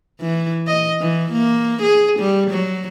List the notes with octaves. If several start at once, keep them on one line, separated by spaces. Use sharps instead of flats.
E3
D#5
E3
A#3
G#4
G3
F#3